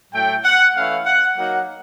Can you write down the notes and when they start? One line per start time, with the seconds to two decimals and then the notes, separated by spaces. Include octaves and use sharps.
0.13 A2 F#3 A3 G5
0.44 F#5
0.75 E3 A3 C#4 E4 F5
1.06 F#5
1.37 F#3 A#3 D#4 F#5